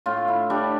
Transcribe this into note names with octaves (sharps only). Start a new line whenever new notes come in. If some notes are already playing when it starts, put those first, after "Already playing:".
A2 F4
E4
G3 D4